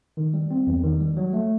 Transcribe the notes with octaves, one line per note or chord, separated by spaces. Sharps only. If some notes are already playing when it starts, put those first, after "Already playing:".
D#3
G3
C4
E2
D#3
G3
F#3
A3